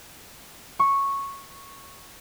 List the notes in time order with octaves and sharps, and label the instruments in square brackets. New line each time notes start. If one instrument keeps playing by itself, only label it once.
[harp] C#6